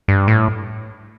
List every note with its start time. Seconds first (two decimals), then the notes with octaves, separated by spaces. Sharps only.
0.08 G2
0.28 A2